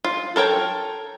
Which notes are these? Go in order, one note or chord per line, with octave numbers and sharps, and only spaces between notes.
F4
A4 A#4 C#5 G5